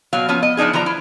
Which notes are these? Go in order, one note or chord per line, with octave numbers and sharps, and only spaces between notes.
B2 F#3 F5
F3 B3 C#4
D#5
F3 B3 D4 D#4 G#4
E3 F3 D4 A#5
E4